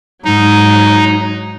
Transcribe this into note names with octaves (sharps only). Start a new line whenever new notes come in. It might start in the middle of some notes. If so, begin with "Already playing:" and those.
G#2 F#3 D#4